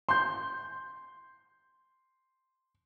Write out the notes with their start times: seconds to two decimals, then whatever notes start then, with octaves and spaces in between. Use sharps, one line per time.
0.09 C6 G6